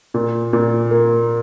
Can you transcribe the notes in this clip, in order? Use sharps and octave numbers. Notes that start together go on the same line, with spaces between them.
A#2
A#2
A#3